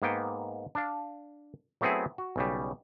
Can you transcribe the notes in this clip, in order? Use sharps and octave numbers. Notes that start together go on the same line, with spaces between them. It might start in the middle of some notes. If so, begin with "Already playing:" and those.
G#2 A#3 B3 G5
D4 F5
F#3 A3 B3 C4 E4 G#4
F#4
B1 C#3 G3